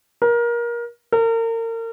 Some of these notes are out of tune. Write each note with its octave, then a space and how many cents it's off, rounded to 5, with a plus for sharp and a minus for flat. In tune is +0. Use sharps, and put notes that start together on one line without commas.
A#4 +25
A#4 -35